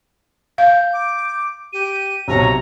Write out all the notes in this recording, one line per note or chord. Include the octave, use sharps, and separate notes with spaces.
F5 G6
D6
G4 D#7
B1 C3 C#5 A#5